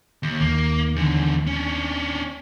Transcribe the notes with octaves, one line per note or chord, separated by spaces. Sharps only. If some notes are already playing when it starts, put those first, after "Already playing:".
D#2
D#2 D#3 A#3
E2 D3
C#4 D4